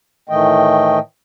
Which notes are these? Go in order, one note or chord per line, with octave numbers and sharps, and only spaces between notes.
A2 D#3 E3 A3 D#5 G5